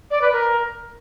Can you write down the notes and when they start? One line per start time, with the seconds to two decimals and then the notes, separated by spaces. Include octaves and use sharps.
0.11 D5
0.22 B4
0.33 A#4